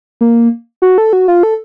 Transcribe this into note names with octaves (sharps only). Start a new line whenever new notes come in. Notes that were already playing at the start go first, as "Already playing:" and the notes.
A#3
F#4
A4
F#4
F4
A4